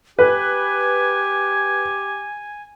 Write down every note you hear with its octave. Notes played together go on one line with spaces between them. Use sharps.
G4 B4 G#5